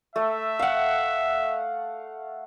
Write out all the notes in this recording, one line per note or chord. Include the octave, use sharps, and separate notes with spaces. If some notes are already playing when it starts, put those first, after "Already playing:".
A3 E5
F5 F#5